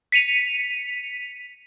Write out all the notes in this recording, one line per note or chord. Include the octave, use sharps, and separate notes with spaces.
B6 C#7 D#7 F7